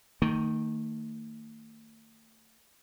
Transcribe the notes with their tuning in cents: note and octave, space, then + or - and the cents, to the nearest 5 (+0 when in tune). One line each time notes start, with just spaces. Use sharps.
D#3 +0 A3 +40